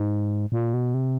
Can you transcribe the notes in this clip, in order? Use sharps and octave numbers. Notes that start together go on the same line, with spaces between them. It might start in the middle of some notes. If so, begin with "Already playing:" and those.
Already playing: G#2
A#2
B2
C3